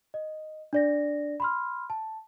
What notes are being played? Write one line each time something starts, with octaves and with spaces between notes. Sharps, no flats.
D#5
D4 D5 A#6
B5 C6 F6
A5